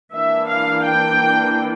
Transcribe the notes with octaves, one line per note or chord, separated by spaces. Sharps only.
E3 A#3 D4 E5
F5
G5